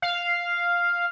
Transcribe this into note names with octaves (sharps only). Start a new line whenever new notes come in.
F5